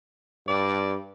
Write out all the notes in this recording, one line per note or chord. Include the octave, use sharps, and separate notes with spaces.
G2 D5